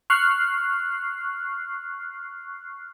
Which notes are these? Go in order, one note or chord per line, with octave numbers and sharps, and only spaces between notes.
C#6 F6 F#6 C7